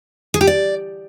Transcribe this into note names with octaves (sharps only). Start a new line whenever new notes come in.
G#4
G4
D5